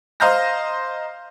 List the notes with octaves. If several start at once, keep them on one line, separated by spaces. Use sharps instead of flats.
C5 D#5 F5 A#5 G6 A#6